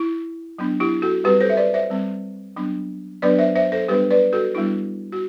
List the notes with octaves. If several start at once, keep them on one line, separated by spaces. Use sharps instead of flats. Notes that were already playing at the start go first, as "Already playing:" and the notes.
Already playing: E4
F#3 B3 D4
E4 G4
F#4 A4
G3 C4 G4 B4
A4 C5
E5
B4 D5
C5 E5
G3 C4
F#3 B3 D4
F#3 B3 D4 B4 D5
C5 E5
C5 E5
A4 C5
G3 B3 D4 G4 B4
B4 D5
F#4 A4
G3 B3 D4 E4
F#4